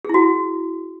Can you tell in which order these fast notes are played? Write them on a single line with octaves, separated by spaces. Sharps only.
G#4 E4 F#4